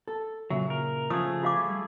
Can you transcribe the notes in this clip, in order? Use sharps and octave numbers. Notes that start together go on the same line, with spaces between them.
A4
A#2 C#3 F#3 E5
A#4
C#3 F3 A3 G#4 D#6
F4 F5 D6
G3